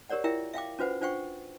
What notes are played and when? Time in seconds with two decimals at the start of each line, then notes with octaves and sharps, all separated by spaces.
0.09 G4 A#4 C#5 D5 F#5
0.24 E4 F4 G4 A#4 E5 G5
0.54 E5 F5 G5 D6
0.79 C#4 F4 F#4 B4 C5 F#5
1.01 D4 F4 C5 F#5 G5 C#6